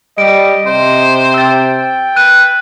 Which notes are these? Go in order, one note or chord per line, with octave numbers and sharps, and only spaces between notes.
G3 D#5 D7
C3 C5
G5 E6 A6
B4 F#6 D#7